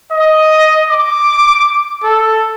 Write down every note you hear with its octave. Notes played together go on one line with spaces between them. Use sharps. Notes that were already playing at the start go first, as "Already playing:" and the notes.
D#5
D6
A4